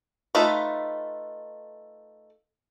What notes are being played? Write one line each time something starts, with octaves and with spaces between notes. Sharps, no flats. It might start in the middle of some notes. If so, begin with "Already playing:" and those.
A3 D#4 F4 B4 E5